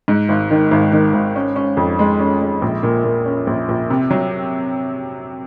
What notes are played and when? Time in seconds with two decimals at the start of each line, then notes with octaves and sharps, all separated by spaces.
0.08 G#2
0.29 G#1
0.51 D#3
0.71 G#1
0.92 D#3
1.13 G#1
1.35 C#4
1.56 C#4
1.77 F2
1.99 G#3
2.20 C#4
2.41 G#3
2.62 A#1
2.83 A#2
3.04 A#2
3.25 C#4
3.47 A#1
3.69 A#1
3.90 C3
4.11 F#3